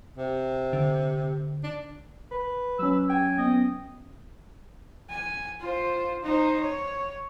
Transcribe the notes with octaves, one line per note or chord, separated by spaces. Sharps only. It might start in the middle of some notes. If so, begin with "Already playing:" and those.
C3
D3
D4
B4
F#3 C#4 E6
G5 G#5
B3 D#5
G#5
F4 C5
D#4 C5
C#5